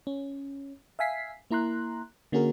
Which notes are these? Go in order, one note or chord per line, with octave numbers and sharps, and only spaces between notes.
C#4
E5 F5 G#5 B6 C7
A#3 E4 A#5 C6 F#6
D3 A#3 C#4 F#4 G#4 A#4